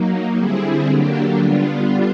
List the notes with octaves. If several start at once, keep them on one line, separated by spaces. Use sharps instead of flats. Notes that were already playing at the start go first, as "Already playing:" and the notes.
Already playing: F#3 A#3 D#4
D3 G3 C4 E4 G#4
D3 F#3 A#3 D4 G4
D3 G3 B3 D4 F4